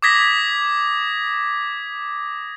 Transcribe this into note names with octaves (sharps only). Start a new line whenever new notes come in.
D6 D#6 G#6 A#6 B6